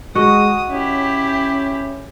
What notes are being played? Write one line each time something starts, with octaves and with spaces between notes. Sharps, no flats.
G#3 F#4 D#5 D#6
C#4 E4 G4